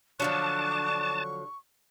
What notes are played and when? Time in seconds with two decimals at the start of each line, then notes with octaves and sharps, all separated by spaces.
0.20 D3 F3 F#3 D4 A5 C#6 F#6